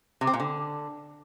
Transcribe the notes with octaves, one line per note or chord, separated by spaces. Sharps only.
C3
C4
A#2
D3